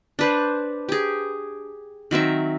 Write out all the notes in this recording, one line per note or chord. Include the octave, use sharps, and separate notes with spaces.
D4 B4 C5
G4 G#4
D#3 F#3 C4 E5